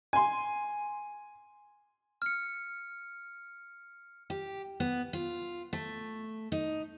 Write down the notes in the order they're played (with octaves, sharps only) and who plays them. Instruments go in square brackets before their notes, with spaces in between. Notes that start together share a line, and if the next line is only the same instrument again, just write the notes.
[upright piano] G#5 C6
[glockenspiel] F6 C#7
[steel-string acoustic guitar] G4
B3
F4
A3
D#4